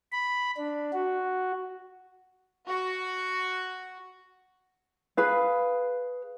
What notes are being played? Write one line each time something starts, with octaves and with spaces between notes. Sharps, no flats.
B5
D4
F#4
F#4
G#4 B4 F5